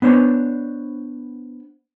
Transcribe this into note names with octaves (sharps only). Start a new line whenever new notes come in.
B3 D4 C5 C#5